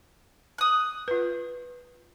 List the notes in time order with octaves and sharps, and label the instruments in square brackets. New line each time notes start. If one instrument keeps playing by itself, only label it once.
[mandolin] D#6 F#6
[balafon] F4 B4